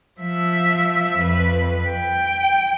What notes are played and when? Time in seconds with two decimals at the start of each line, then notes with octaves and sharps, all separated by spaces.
0.20 F3 E5
1.18 F2 B4
1.90 G5